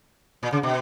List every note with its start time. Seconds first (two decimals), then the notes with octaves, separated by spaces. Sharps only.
0.43 A#2
0.53 C#3
0.63 B2